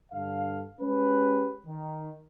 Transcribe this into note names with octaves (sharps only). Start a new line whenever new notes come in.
G2 D3 A4 F5
G#3 C#4 G4 B4
D#3